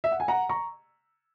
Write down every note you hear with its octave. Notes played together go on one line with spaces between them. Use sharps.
E5
F#5
G#5
F#5 A#5
A#5 C#6